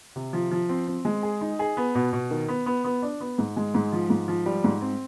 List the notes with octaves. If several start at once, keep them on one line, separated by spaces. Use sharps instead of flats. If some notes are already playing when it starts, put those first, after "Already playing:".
C3
F3
F3
C4
C4
G#3
G#4
D#4
G#4
B3
B2
B2
D#3
B3
B3
B3
D4
B3
G#2
G#3
G#2
F3
G#2
F3
G3
G#2
C4